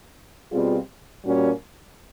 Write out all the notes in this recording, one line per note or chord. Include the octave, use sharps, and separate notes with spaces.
B2 G3 C4 F4 G#4
A#2 G3 A#3 C#4 F#4